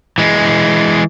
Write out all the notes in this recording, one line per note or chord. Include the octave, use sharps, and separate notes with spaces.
E3 G#3